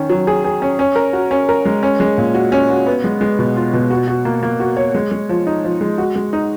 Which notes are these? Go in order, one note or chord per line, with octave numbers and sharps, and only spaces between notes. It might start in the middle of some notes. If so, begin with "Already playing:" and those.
Already playing: D#3 C#4
F#3
G#4
G#4
C#4
C#4
A#4
F#4
C#4
A#4
G#3
C#4
G#3
A#2
F#4
C#4
F#4
B3
G#3
G#3
B2
F4
B2
F#4
F#4
A#3
A#3
F#4
C#5
G#3
G#3
F3
D#4
F3
G#3
F#4
G#3
D#4